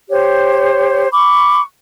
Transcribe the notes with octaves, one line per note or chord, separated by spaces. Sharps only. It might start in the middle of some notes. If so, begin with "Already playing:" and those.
G4 C5 C#5
B5 C#6 D6